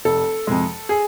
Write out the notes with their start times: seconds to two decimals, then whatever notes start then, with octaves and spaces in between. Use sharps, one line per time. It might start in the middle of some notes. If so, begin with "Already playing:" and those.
0.05 F1 A4
0.47 F2 C3 G#3
0.89 G#4